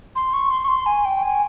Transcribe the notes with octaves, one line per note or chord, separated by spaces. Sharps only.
C6
C#6
C6
C#6
C6
G#5
G5
G#5